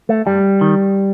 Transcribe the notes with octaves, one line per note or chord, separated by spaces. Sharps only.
A3
G2 G3
D#3